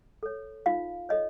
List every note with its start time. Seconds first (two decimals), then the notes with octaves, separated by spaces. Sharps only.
0.23 A4 C#5
0.66 D#4 F4 F5
1.09 A4 C#5 D#5